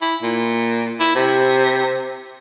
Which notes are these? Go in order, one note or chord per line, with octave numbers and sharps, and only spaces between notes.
E4
A#2
E4
C3